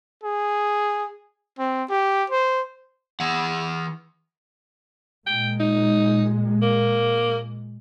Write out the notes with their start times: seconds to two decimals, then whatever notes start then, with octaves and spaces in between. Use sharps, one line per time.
0.24 G#4
1.59 C4
1.90 G4
2.30 C5
3.20 E3 F#5
5.26 A#2 G#3 G5
5.60 D#4
6.62 A#3